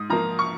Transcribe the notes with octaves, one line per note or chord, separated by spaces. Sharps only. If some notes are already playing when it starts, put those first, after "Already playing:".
Already playing: G#2 D#6
F3 A#3 A#5
C#6